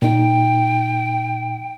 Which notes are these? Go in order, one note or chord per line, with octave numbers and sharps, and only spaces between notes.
A#2 D#4 G5